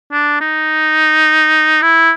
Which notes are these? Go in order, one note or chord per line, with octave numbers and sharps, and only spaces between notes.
D4
D#4
E4